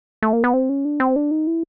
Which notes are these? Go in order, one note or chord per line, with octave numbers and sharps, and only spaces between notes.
A3
A#3
B3
C4
C#4
D4
C4
D4
D#4
E4